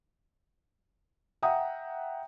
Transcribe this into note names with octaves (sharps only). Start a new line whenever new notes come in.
E5 F#5 G5 A#5 D#6